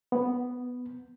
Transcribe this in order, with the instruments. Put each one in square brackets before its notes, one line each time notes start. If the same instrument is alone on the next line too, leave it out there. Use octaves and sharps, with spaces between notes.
[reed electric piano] B3